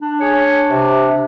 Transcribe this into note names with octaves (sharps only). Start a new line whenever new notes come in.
D4
G#4 C#5
C3